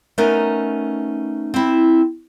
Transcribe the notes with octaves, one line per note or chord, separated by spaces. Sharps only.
A3 B3 C#4 D#4 A#4
C4 E4